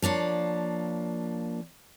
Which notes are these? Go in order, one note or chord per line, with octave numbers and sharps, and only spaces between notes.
F3 A#3 D4 C#5